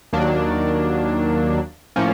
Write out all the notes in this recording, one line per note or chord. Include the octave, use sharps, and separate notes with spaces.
D#2 D#3 F#3 A#3 D4
A2 F3 A#3 C#4